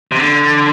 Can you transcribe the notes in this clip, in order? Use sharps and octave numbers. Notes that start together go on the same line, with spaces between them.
C3
D3